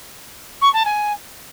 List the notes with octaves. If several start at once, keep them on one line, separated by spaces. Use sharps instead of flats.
C#6
A5
G#5